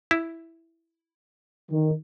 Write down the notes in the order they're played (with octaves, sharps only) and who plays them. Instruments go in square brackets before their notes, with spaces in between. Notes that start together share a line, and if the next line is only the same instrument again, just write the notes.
[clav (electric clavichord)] E4
[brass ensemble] D#3